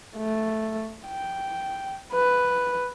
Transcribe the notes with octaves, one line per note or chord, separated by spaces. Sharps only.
A3
G5
B4